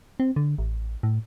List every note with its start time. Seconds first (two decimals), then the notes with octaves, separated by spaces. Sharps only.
0.20 C4
0.36 D3
0.58 A1
1.03 A2